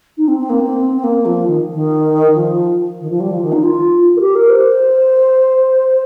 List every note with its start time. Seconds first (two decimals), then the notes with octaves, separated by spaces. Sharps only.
0.17 D#4
0.28 C4
0.39 C4
0.50 A#3
0.60 C4
0.96 C4
1.04 A#3
1.25 F3
1.47 D#3
1.71 D#3
2.34 F3
3.01 D#3
3.10 F3
3.20 G3
3.31 F3
3.42 D#3
3.52 D#4
3.63 F4
4.17 A#4
4.20 G4
4.35 A#4
4.49 C5